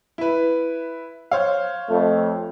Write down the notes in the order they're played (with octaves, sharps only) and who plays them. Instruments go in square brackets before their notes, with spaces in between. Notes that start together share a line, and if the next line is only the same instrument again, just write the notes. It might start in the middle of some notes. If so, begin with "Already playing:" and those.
[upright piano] E4 B4
C5 C#5 F5
[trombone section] F2 A3